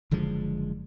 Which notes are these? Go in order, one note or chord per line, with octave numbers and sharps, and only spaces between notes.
F#1 D3 F3 G#3